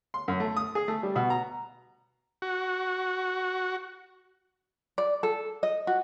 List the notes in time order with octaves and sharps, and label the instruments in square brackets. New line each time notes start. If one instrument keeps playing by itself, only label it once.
[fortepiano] C6
F#2
A3
D#6
G#4
A3
G3
B2
A#5
[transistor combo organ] F#4
[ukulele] D5
A4
D#5
F#4